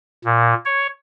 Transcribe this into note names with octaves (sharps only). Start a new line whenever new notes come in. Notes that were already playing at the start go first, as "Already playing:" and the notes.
A#2
C#5